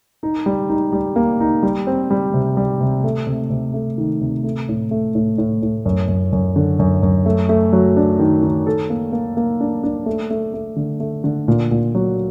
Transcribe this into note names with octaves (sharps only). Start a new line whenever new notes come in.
D#4
G3
D#4
G3
A#3
D#4
G3
C4
G3
C3
G3
C3
A3
C3
C3
A3
D#3
C3
A3
A2
A3
A2
A2
A2
F#2
F#2
F#2
D3
F#2
F#2
A3
A3
F#3
D4
D#3
D#3
A4
A#3
A#3
A#3
D4
D4
A3
A3
A3
D3
A3
D3
A#2
A#2
F#3